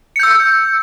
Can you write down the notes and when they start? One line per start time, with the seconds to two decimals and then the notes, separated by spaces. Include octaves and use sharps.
0.16 C#7
0.19 G6
0.23 E6